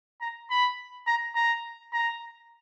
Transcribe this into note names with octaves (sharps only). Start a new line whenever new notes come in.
A#5
B5
A#5
A#5
A#5